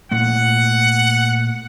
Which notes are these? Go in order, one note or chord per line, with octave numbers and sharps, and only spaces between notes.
A#2 A3 F#5